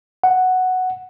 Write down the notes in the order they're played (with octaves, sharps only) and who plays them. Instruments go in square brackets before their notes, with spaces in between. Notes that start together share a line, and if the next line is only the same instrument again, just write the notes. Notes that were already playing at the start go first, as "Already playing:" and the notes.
[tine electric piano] F#5